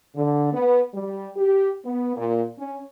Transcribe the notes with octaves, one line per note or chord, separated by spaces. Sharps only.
D3
B3
G3
G4
B3
A#2
C#4